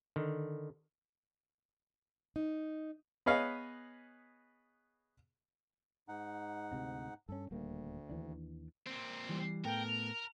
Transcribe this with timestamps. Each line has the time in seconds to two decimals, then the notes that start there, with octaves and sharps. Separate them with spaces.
0.16 D3 D#3
2.36 D#4
3.26 B3 G#4 B4 C#5 D#5 F5
6.08 G#2 D#4 F#5
6.72 D2 C3 C4
7.29 G2 C#4 A4
7.51 D#1 D2 G3 A#3
8.09 D#2 E3 D4
8.87 A#2 C4
9.29 E3 G3
9.64 A2 B3 A4 A#4 G5
9.87 F7